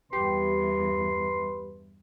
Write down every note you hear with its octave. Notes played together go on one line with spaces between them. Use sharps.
E2 G2 G4 B4 C6